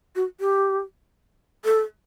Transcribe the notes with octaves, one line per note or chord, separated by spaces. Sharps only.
F#4
G4
A4